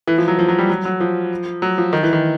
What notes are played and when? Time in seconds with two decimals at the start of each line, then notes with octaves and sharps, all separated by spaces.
0.07 E3
0.18 F3
0.28 F#3
0.39 F3
0.48 F#3
0.58 G3
0.70 F#3
0.85 F#3
1.00 F3
1.62 F#3
1.78 F3
1.93 D#3
2.03 E3
2.13 D#3